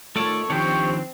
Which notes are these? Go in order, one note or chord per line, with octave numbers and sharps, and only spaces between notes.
D#3 A3 F4 A4 C#5 D5
D#3 F3 C4 D4 G4 C#5